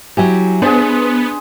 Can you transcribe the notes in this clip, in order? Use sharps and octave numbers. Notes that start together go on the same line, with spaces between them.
F#3 E4 G4 G#5
B3 D4 G#4 C5